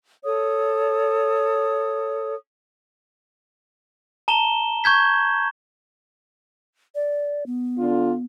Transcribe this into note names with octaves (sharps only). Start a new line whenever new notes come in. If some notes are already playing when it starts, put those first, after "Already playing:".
A4 C#5 D#6
A5 A#5 E7 G7
C#6 G6 G#6 B6
D5
B3
D3 D4 F4